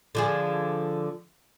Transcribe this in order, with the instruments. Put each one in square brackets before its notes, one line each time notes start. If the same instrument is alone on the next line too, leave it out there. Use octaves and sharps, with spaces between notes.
[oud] D3 F3 G#4